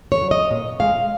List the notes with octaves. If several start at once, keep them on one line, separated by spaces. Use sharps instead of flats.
C#5
F#3
D#5
A#2
F3 G#3 F5